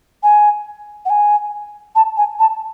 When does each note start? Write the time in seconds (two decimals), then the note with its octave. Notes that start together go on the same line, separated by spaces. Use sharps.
0.23 G#5
1.05 F#5
1.09 G#5
1.95 A5
2.17 G#5
2.39 A5